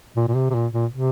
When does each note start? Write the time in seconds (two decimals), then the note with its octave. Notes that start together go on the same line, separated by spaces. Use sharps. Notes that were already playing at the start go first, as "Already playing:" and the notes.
0.16 A#2
0.28 A#2
0.35 C3
0.50 C3
0.54 A#2
0.73 A#2
0.91 C3